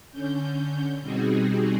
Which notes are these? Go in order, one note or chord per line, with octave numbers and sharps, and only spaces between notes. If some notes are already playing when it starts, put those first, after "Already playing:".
D3 C#4 G6
B2 G3 C4 D#4 F#4 G#4